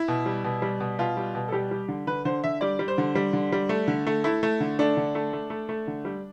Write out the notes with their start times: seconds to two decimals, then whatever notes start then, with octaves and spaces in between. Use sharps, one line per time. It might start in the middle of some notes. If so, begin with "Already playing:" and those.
Already playing: E4
0.08 B2
0.26 G3
0.44 B2
0.62 G3
0.80 B2
0.99 B2 F4
1.17 G3
1.35 B2
1.48 A4
1.52 G3 G4
1.71 G3
1.88 D3
2.07 D3 B4
2.25 D3 C5
2.44 D3 E5
2.61 G3 D5
2.79 G3
2.88 C5
2.98 D3
3.15 G3
3.33 D3
3.52 G3
3.69 A3
3.88 D3
4.07 A3
4.24 A3 E4
4.43 A3
4.60 D3
4.79 A3 D4
4.97 D3
5.15 A3
5.33 A3
5.50 A3
5.69 A3
5.87 D3
6.05 G3